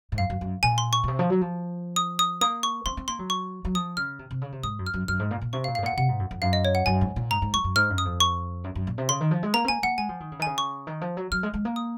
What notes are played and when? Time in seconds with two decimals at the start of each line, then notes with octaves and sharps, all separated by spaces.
0.12 G#2
0.18 F#2 F5
0.30 F#2
0.41 F#2
0.63 A#2 G#5
0.78 C6
0.93 C#6
1.04 A#2
1.08 C3
1.19 F3
1.30 F#3
1.41 F3
1.96 D#6
2.19 D#6
2.41 A#3 D#6
2.63 C#6
2.86 C4 C6
2.97 C4
3.08 A#3 C6
3.19 F#3
3.30 C#6
3.65 F#3
3.75 F3 D#6
3.97 C#3 F6
4.19 C3
4.31 C3
4.42 C#3
4.52 C3
4.63 G#2 D#6
4.79 F#2
4.86 F6
4.94 F#2
5.08 F#2 F6
5.19 G#2
5.31 A#2
5.41 A#2
5.53 C3 C#6
5.64 F5
5.68 A#2
5.75 G#2 F5
5.83 A#2 F#5
5.97 C3 F#5
6.08 G#2
6.19 F#2
6.31 F2
6.42 F#2 F5
6.53 D#5
6.65 C#5
6.75 F#5
6.86 F#2 G#5
7.01 G#2
7.16 A#2
7.31 G#2 A#5
7.42 G#2
7.53 F#2 C#6
7.64 F#2
7.75 G#2 F6
7.90 F#2
7.98 D#6
8.05 F2
8.20 C#6
8.64 F#2
8.75 F#2
8.87 A#2
8.98 C3
9.09 C#3 C6
9.21 D#3
9.31 F3
9.43 G#3
9.54 A#3 A#5
9.65 C4
9.68 A#3 G#5
9.83 A#3 F#5
9.98 G#3 G#5
10.09 F3
10.20 D#3
10.32 C#3
10.39 D#3
10.42 C#3 G#5
10.58 C#6
10.87 D#3
11.01 F3
11.17 F#3
11.32 F#3 F6
11.43 G#3
11.54 G#3
11.65 A#3
11.76 D#6